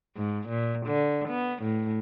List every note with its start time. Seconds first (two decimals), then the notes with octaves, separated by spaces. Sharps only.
0.16 G#2
0.48 A#2
0.86 D3
1.29 B3
1.63 A2